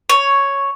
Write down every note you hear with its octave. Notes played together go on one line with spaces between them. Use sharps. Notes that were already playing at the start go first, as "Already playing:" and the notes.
C#5